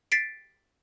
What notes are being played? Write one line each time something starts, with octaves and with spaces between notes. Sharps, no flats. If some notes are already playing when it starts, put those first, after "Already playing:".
A6 B6 C7 D7